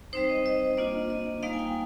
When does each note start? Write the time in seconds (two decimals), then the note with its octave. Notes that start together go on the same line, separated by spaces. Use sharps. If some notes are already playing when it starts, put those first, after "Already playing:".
0.13 G3 C4 D#4 C5
0.29 D#5
0.46 D#5
0.77 A#3 D4 F4 D#5
1.10 D#5
1.42 G3 A#3 D#4 F5
1.53 G#5
1.59 G5